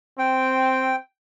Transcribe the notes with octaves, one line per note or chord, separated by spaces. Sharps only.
C4 G5